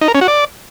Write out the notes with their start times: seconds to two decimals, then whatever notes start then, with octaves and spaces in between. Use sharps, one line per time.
0.01 D#4
0.08 A#4
0.15 C#4
0.21 F#4
0.28 D5